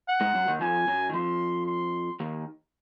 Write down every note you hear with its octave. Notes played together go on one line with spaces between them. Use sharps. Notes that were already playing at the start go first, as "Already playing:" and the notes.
F#5
G#2 G#3
F#2 F#3
D#2 D#3
F2 F3 G#5
F#2 F#3
D#3
F2 F3 C6
C6
D#2 D#3